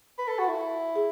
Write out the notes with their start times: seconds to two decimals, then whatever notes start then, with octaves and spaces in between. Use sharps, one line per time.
0.18 B4
0.28 A4
0.39 F#4
0.48 E4
0.96 G#4